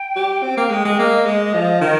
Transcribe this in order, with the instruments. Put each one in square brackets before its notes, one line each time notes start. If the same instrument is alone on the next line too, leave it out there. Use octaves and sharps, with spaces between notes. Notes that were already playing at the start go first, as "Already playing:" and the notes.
Already playing: [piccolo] G5
[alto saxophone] G4
C4
A#3
G#3
G#3
[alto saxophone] A#3 [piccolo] D#5
[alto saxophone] G#3
F3
D#3